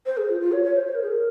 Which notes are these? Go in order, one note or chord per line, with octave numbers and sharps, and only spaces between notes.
C5
G#4
F4
F4
C#5
C#5
C5
C5
A#4
G#4
A#4